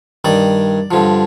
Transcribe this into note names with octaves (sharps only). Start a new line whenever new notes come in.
G2 D#3 D5
G2 D3 F3